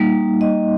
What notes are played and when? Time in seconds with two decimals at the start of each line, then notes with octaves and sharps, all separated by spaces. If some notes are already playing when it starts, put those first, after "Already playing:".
Already playing: G3 A#3 D#4
0.41 D#5